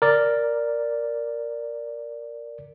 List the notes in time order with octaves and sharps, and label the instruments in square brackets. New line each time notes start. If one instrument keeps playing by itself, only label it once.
[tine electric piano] A#4 D5